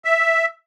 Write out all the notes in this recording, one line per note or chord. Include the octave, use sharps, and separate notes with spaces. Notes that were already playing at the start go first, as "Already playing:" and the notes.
E5